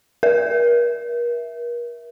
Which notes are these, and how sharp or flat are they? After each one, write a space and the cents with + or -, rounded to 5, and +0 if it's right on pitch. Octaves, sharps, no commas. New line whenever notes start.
A#4 +40 E5 +0